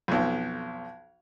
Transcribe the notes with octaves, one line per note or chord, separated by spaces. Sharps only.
B1 F2